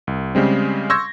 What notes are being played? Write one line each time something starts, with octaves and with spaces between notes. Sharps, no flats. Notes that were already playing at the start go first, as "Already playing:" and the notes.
C2
C#3 G3 G#3 C4
C6 C#6 E6 G6 G#6 A#6